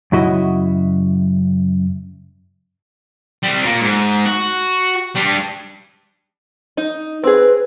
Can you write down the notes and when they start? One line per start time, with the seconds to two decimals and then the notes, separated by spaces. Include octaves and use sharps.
0.12 F#2 C#3 E4 F#4 D#5
3.43 G3 C4
3.66 A#2 A#3
3.82 G#2
4.25 F#4
5.15 G3 D4
6.77 D#4
7.24 C4 G#4 B4